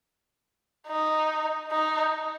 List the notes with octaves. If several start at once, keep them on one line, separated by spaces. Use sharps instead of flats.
D#4
D#4